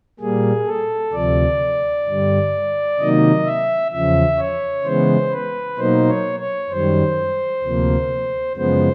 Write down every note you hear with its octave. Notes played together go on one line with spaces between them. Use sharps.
A#2 G3 A#3 G#4
A4
D2 C3 F3 D5
G2 D3 G3
C3 D#3 F#3 A#3 D#4 D#5
E5
E2 C#3 F3 E5
C#5
C#3 E3 G#3 B3 C5
B4
B2 F#3 A#3 D#4 C5
C#5
C#5
F#2 D#3 G3 C5
D2 C3 F3 A#3
F#2 C#3 F3 G#3 B3 C5